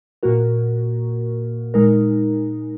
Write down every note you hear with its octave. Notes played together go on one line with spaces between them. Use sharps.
A#2 A#3 F#4 A#4
A#2 G#3 D#4 A#4